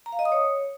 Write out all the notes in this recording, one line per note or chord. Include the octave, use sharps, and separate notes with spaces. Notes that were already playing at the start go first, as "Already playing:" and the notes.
A#5
F5
D#5
D#6
C#5